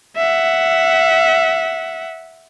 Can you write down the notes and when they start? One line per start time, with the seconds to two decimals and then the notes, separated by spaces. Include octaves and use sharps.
0.16 E5 F#5